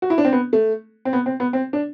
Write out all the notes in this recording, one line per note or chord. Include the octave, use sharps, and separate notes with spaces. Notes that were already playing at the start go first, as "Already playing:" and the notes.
F#4
E4
D4
C4
B3
A3
C4
B3
C4
B3
C4
D4